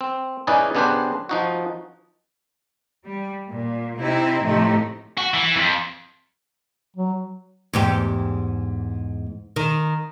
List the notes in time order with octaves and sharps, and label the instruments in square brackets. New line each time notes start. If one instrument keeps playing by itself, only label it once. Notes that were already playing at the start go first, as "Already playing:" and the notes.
[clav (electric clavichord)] C4
C#4 D#4 E4 G#4 B4 D5
C#3 B3 D4 G4 B4 C5
F3 D#4 F#4
[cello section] G3
A#2
C3 C4 D#4 E4
A2 C3 F3 A3 D#4
[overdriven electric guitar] F#4
E3
F2
[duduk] F#3
[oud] E2 G#2 G4
D#3